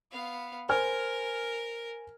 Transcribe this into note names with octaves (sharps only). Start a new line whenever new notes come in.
B3 F5
A#4 C5 G#5 F6